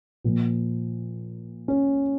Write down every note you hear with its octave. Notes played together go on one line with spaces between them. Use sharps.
A#2 F3
C#4